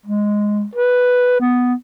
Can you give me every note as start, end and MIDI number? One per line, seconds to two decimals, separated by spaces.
0.06 0.64 56
0.75 1.37 71
1.40 1.74 59